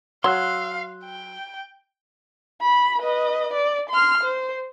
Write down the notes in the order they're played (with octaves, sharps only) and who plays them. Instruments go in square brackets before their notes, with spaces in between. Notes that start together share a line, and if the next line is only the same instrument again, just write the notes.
[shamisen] F#3 [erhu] F5 [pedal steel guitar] C6 E6 F#6
[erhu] G5
[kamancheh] B5
B4 D#5
D5
C6 F6
C5